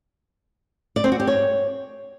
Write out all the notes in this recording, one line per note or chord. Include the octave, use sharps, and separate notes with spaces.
D5
C4
F#4
G4
C#5